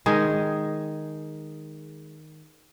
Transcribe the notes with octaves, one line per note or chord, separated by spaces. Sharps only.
D#3 G#3 G#4